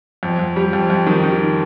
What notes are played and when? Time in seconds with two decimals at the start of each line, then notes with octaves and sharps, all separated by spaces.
0.23 F2
0.39 F2
0.56 G3
0.73 F2
0.90 F2
1.07 D#3
1.24 D#3